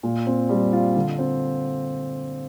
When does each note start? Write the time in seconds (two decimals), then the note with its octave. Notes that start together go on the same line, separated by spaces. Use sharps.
0.03 A#2
0.27 C4
0.49 G3
0.73 F4
0.96 D3
1.19 C4